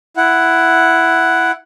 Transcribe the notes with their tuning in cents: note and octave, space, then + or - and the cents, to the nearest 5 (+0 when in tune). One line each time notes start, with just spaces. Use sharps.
E4 +10 F#5 +0